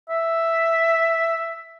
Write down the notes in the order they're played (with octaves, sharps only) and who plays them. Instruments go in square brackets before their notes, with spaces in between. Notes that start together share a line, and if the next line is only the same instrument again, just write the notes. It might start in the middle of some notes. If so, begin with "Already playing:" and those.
[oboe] E5